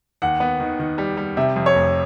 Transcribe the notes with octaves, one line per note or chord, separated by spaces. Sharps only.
D#2 F#5
B3
D#3
D#3
G3
G3
C3 E5
F2
C#5
F1